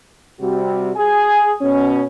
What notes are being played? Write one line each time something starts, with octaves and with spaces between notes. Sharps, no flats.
C3 G3 F#4
G#4 G#5
B2 C#4